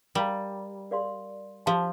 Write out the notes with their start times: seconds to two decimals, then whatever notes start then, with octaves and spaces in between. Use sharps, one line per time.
0.15 G3 A#4 F5 A#5
0.91 A#4 D5 F5 C6
1.66 F3 G4 C5 F5 A5 C6